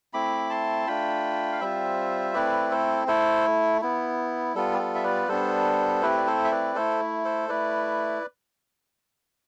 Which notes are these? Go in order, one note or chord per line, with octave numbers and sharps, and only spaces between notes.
A3 C4 E4 B5 D6
A5 C6
A3 D4 F4 G5 B5
F5
G3 C4 F4 C5 E5
A3 C4 E4 B4 D5
A4 C5
A3 E4 A4 C5
B3 E4
G3 B3 F4 A4
G4
A4
E5
B4 D5
G3 B3 D4 A4 C5
A3 C4 E4 G4 B4
D5
A4 C5
E5
B4 D5
A3 E4 A4 C5
A4 C5
A3 E4 B4 D5